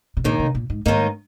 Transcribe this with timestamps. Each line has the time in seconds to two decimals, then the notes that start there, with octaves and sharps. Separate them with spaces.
0.17 C3
0.24 D#2 A#2 D#3 A#3 D#4
0.39 C3
0.55 A#2
0.70 G#2
0.86 D#2 G#2 D#3 A#3 D#4